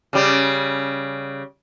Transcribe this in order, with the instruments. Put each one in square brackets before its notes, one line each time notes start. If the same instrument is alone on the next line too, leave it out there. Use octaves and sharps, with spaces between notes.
[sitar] C#3 G3